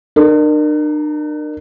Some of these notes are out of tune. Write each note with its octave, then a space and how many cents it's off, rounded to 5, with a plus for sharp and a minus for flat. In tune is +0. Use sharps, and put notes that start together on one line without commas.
D4 +45 A#4 +0